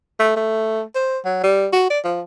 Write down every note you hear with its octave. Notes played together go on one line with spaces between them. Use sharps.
A3
A3
C5
F#3
G3
F#4
D5
F3